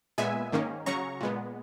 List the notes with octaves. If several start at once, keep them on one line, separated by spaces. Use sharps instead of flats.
A#2 G#3 B3 E5 G#5
G#2 D#3 A#3 C#4
C#3 F#3 C#4 A#5 C#6
A#2 G#3 B3